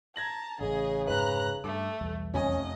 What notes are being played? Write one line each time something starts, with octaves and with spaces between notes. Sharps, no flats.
A5 A#5 G#6 A#6 F#7
A1 A2 C#3 G#4 D#5
F1 G#2 B4 A#5 B5 F#6
G2 A3 D6
B1 E2 G3
F1 C#4 D#5 G#5